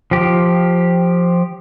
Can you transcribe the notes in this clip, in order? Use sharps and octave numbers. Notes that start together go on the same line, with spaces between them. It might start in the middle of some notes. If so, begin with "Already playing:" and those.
F3 G4